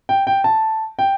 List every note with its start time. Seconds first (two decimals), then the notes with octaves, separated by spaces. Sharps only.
0.09 G5
0.27 G5
0.44 A5
0.99 G5